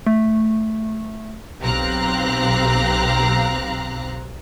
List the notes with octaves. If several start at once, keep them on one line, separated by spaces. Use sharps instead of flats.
A3
B1 C4 G4 F5 A#5 F#6